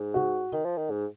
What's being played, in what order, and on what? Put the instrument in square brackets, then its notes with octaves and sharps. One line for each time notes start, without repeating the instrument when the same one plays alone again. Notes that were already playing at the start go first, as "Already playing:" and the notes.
Already playing: [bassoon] G#2
[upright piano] F#4
[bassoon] D#3
F3
D#3
G#2